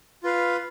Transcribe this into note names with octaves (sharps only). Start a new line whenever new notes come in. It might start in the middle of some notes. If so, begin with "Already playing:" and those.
F4 B4 F5